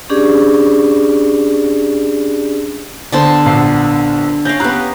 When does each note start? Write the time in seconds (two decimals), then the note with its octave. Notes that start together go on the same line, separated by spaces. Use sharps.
0.10 C#4 D4 G4 G#4 D5
3.12 D3 B3 C5 A5 C6
3.46 A#1 B3 C7
4.45 C#4 F5 G6 A#6 D7
4.60 B3 G4 A#5 F#6